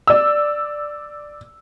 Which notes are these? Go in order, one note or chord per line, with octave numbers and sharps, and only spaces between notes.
D5 E6